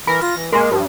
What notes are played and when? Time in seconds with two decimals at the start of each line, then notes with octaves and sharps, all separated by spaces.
0.07 E3 A#4 B5
0.22 F4 A#6
0.37 E3
0.52 G#3 A#3 A#4 C6
0.71 G2 F3